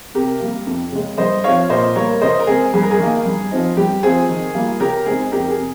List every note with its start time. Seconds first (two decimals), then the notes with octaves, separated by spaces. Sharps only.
0.15 C3 G4 A#4
0.40 G3 A#3
0.67 F2
0.92 C#3 G#3
1.18 G2 C5 D#5
1.44 F3 C4 D#4 C#5 F5
1.69 A#2 C5 D#5
1.96 G3 A#3 A#4 C#5
2.22 C#3 C5 D#5
2.40 A#4
2.47 G#3 C4 G#4
2.74 G2 G#4
2.82 A#4
2.91 G#4
2.99 D#3 A#3
3.25 G2
3.51 F3 C4 D#4
3.77 G2 G4
4.03 F3 C4 F4 G#4
4.29 D#3
4.55 G3 A#3 F4
4.80 C#3 G4 A#4
5.06 G#3 C4 D#4 G#4
5.32 F2 G4 A#4
5.50 G#4
5.57 C3